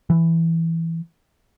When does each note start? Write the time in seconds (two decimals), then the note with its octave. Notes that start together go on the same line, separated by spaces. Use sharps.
0.10 E3